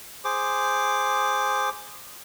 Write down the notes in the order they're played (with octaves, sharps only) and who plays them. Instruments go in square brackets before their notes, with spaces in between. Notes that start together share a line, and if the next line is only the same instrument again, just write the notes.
[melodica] G#4 C5 D6